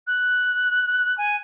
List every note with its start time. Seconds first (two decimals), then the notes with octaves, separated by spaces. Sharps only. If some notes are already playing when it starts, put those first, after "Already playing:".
0.07 F#6
1.18 G#5